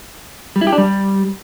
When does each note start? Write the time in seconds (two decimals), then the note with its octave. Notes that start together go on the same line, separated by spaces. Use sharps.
0.56 G3
0.61 E4
0.67 G4
0.72 D4
0.78 G3